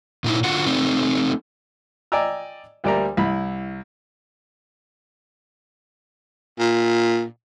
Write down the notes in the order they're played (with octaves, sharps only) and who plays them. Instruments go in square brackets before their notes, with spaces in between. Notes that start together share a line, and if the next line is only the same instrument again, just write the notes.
[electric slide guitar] A#2 D#4 E4
D3 F4 F#4 F#5
A3 C4 D#4
[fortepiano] D5 D#5 G5 G#5 A#5 E6
D2 G3 A#3 D5 E5 A#5
C2 E4 B5
[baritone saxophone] A#2